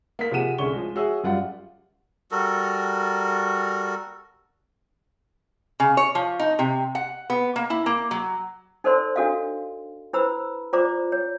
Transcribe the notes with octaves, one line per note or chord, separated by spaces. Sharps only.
A#3 B6
C3 F3 G#4 F#5 D#7 E7
C2 D3 C#4 G#4 C#6 G7
F3 G#3
F#4 G#4 C#5 E5 E6
F#2 G3 F4 F#5
G3 F#4 A4 A#4
C#3
C#5
F3
D#4
C3
F#5
B3
A#3
E4
A#3
F#3
D#4 A4 A#4 C5 D5 C6
D4 F#4 A4 D#5 F5
E4 B4 C5 A#5 B5 E6
F4 C5 D5 A#5 D6
C#5